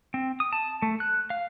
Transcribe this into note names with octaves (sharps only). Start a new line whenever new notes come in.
C4
D#6
A5
A3
F#6
F5